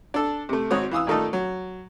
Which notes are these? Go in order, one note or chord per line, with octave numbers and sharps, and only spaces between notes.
D4 A4
C3 A3
G#1 G#2 C4 F#4 C#5 D#6
E3 F5 D#6 E6
A#2 D#3 A3 D#4 A4
F#3